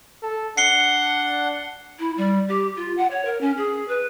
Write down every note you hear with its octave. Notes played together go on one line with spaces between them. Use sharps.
A4
D4 F#5 C7 C#7 G7
E4
G3
G4
F4
F#5
C#5
A#4
C#4
G#4
B4